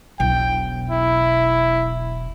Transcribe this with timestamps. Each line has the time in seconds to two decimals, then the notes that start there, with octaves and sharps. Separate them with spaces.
0.20 E1 B1 G5
0.90 E4